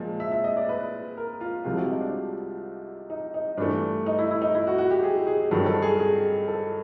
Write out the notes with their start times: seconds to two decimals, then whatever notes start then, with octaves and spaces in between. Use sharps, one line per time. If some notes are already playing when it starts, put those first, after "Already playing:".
Already playing: A#2 F3 G#3
0.20 E5
0.32 E5
0.44 D#5
0.57 D5
0.69 B4
1.17 A#4
1.41 F4
1.64 C2 C3 F3 G#3 F4
1.78 F#4
1.89 D#4
2.01 D4
3.10 D#4
3.34 D#4
3.57 G2 E3 A3 D4
4.06 D#4
4.19 E4
4.31 E4
4.42 D#4
4.55 E4
4.67 F#4
4.78 F#4
4.91 G4
5.03 G#4
5.27 G#4
5.51 G2 D#3 F#3 A4
5.66 A4
5.82 G#4
6.00 G#4
6.48 A4